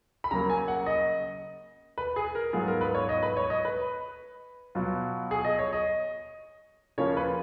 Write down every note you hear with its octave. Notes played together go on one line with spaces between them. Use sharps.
B5
C#3 F#3 A#3 A#5
G#5
F#5
D#5
B4
G#4
A#4
G#2 F#3 B3 F4 G#4
A#4
B4
C#5
D#5
B4
C#5
D#5
B4
B2 F#3 B3 F4
G#4
D#5
C#5
D#5
C#3 F3 A#3 C#4 F4 C#5
B4